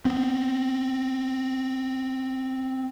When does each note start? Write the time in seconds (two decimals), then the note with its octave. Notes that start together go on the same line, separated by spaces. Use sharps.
0.05 B3 C4